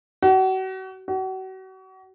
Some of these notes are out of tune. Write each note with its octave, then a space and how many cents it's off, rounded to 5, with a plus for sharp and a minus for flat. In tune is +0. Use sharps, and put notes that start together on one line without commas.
F#4 +35
F#4 +35